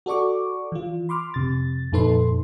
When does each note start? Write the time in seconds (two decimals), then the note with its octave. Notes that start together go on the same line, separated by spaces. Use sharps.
0.06 F#4 A4 D5 C#6 D6
0.72 E3 F4
1.09 B5 C6 D6 F6
1.34 F2 C3 A6
1.92 F2 A#2 D#4 A4 B4 C6